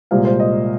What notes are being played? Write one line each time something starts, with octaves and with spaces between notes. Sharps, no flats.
C2 A#2 G#3 C5 F5
C5
D#5